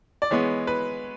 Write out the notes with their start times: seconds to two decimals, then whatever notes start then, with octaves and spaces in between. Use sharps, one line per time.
0.22 D5
0.31 E3 G#3 B3 C#5
0.67 B4